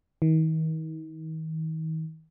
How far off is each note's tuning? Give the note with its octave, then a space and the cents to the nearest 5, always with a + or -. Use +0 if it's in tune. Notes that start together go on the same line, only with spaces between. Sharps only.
D#3 +40